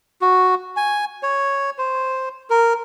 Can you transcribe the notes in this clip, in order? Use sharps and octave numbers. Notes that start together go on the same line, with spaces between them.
F#4
G#5
C#5
C5
A#4